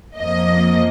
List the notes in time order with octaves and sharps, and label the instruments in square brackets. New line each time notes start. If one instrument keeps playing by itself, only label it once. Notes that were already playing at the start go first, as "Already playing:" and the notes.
[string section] F2 F3 A#3 D#5